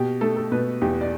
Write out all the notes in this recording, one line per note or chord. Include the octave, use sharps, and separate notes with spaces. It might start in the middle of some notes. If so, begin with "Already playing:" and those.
Already playing: B2 G4
A3 A4
A4
B2 B4
E2 G4
D5